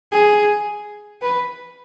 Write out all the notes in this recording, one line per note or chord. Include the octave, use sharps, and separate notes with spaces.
G#4
B4